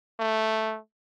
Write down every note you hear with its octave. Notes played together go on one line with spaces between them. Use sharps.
A3